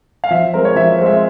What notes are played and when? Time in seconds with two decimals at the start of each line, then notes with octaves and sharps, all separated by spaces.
0.24 F5
0.31 F3 E5
0.53 G#3 C4 A#4
0.65 C#5
0.76 F3 E5
0.98 G#3 C4
1.06 E5